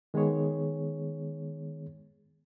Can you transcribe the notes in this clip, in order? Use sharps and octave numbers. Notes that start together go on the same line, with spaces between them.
D#3 G#3 B3 G#4 C#5